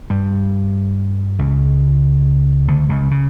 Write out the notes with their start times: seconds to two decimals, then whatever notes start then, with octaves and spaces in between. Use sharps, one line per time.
0.10 G2 G3
1.39 C#2 C#3
2.68 D2 D3
2.89 C#2 C#3
3.11 C#3